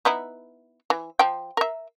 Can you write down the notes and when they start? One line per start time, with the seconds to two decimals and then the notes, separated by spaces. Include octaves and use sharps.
0.05 B3 D#4 E4
0.90 E3
1.19 F3 G5
1.57 A#4 E5